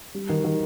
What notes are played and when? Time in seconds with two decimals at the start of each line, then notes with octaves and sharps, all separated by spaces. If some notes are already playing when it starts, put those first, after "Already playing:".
0.14 G3
0.29 D#3
0.44 D#3